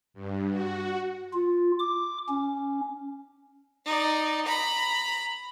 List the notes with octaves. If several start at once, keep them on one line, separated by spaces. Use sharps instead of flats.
G2
F#4
F4
D6
C#4
D#4 D5
A#5 B5